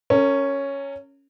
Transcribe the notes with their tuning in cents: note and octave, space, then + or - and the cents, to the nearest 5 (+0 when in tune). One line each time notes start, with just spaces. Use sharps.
C#4 +0 A#4 -35